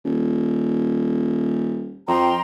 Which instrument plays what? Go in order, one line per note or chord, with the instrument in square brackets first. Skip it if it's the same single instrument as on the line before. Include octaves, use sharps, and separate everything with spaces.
[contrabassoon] D#1
[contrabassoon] F2 [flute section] G5 A#5 C6